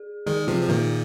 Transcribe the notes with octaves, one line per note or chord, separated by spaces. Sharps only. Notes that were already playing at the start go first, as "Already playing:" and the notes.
Already playing: G#4
D#3 G#3 G#4
C3 F3 F4
F3
A#2 D#3 A#4